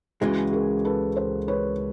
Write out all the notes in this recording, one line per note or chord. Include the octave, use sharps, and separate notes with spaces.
C#2 C#3 E3 G#3 F#4 G#4
G#4 A#4
A4 B4
A#4 C5
B4 C#5